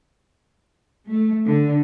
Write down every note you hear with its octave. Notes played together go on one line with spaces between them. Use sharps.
A3
D3